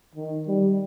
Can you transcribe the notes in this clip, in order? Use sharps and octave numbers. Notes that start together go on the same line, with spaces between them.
D#3
G3